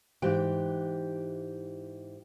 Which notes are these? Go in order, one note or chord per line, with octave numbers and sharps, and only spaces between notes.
G#2 E3 G4 G5